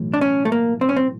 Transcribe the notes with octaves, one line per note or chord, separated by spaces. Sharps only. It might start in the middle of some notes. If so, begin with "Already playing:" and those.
Already playing: B1 A2 E3
D4
C#4
A3
A#3
C4
C#4
C4